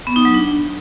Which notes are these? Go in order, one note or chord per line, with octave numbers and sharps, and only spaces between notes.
B3
D#4
F#3
D4